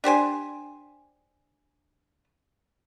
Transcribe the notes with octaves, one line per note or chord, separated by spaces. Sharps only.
D4 G4 C5 G#5